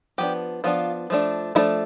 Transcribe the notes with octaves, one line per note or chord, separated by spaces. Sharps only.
F3 B3 D4 G4
F3 B3 D4 F4
F3 A3 D4
F3 A3 D4 E4